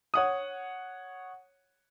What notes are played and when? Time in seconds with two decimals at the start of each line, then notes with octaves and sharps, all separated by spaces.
0.14 C#5 F#5 D#6